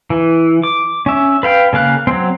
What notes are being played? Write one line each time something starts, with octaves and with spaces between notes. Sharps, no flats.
E3
D6
C#4 E5
B4 F5 G5
C#3 A#3 F5 F#6
F#3 C4